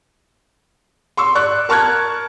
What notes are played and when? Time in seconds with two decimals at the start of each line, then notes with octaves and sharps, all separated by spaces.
1.17 C6 C#6 E6
1.35 D5 C#6 F#6
1.69 A#4 A5 C#6 F6 F#6 G#6